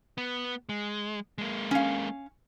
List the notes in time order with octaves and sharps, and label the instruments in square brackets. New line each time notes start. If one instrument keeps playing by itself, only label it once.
[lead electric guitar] B3
G#3
G#3 A#3
[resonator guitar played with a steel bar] C#4 F5